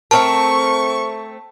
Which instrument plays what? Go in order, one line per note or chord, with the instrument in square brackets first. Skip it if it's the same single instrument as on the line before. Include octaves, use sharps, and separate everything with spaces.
[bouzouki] A3 C4 A#4 [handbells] A5 [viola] C#6